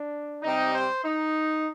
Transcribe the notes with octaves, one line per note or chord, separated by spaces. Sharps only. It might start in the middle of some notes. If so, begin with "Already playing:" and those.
Already playing: D4
C3 G3 C4 D#4
C5
D#4